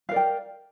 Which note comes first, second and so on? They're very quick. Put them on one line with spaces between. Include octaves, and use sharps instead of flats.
F5 A#4 D5 G5